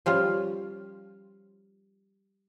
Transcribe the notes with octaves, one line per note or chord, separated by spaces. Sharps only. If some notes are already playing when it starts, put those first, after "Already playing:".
F3 G3 C#4 F4